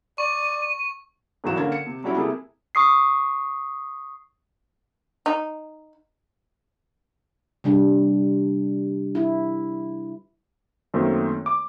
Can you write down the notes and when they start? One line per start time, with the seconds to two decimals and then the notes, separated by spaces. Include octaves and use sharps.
0.18 D5 C#6 D#7
1.44 G#1 G#2 E3 F#3 E7
1.56 D3 A#3 C#4 A#4 F5 G#6
1.72 C#7
1.87 C3
2.04 F#3 G3 C#4 E4 F#4
2.16 C3 A#3 E4 G#4 A4
2.75 C#6 D#6 C7
5.26 D#4
7.64 C3 G3 D4
9.15 E4
10.94 F#2 D#3 A3 A#3 C4
11.46 D6